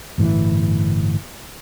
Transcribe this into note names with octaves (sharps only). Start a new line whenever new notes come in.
G1 A2 E3